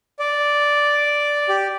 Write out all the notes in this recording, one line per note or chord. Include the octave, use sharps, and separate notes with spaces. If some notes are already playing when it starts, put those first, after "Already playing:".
D5
G4